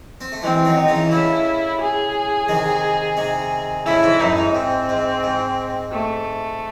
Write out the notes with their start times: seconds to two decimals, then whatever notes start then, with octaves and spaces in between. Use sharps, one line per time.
0.21 C4
0.32 A3
0.42 E3 G#3 C4
0.65 D#3 F#3
0.77 D#4
0.88 C#3 E3
1.11 A2 C#3 E4
1.81 G#4
2.49 C3 D#3
3.17 C3 D#3
3.86 A2 C#3 E4
4.03 G#2 C3
4.20 F#2 A2 D#4
4.37 G#2
4.55 G#2 C4
4.89 G#2
5.23 G#2
5.92 A3